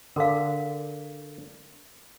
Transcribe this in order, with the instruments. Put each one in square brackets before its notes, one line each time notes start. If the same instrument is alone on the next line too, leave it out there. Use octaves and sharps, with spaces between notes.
[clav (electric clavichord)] D3 [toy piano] A#4 F5